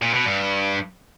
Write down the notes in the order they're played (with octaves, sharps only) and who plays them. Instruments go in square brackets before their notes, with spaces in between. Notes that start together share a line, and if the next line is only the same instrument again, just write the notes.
[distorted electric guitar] A#2
B2
G2